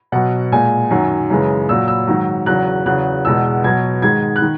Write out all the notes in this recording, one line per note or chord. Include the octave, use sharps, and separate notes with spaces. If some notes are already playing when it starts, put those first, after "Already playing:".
B2 F#3 F#5
A#2 G#3 G#5
F#2 D#3 F#3
F#2 C#3 E3 G#3
A#2 F#3 E6
E6
G#2 D#3 F#3
E2 C#3 F#3 F#6
E2 C#3 F#3 F#6
E2 B2 G#3 E6
B2 F#3 G#6
G#2 D#3 G#3 G#6
F#6
D#3